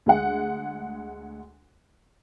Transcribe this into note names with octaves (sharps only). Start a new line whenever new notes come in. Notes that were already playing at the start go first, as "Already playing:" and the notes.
D2 G#3 F#5